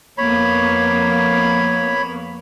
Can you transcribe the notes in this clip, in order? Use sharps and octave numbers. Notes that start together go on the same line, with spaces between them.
F2 A#3 B3 C#5 B5